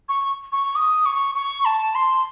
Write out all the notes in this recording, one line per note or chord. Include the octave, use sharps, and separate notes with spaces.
C#6
C#6
D#6
C#6
C#6
A5
C6